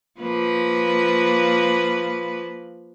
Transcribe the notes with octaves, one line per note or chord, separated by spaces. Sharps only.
F3 A#3 B4